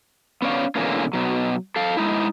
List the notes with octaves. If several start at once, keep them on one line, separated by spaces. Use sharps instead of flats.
B3 C#4 C#5 D5 F5
B2 D3 E3 G#3 A#3 C#4
B2 F#3
A4 F5
G#3 D#4 E4